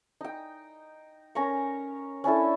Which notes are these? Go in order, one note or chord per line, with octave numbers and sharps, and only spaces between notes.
D#4 G5
C#4 A#4 A#5 C#6
C#4 D4 E4 A4